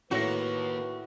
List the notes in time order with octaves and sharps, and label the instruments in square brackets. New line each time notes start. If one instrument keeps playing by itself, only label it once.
[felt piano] A2 C#5 A#6 [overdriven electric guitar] D#3 A#3 [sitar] F#4 [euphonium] B4